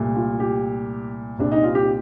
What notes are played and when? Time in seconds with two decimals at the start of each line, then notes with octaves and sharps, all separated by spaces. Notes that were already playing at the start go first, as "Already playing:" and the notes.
Already playing: C2 A#2 A3
0.16 F4
0.40 G4
1.38 C2 A#2 G3 C4 D4
1.52 D#4
1.64 F4
1.75 G4